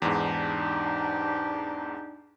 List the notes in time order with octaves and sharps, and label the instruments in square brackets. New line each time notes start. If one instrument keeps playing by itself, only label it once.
[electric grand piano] E2 G#2 [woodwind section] D4 D#4 G4